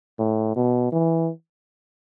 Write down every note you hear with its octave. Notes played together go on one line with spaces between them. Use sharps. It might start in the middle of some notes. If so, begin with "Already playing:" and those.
A2
B2
E3